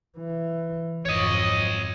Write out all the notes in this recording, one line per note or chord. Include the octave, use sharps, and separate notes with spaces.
E3
G#1 F2 C#5 D#5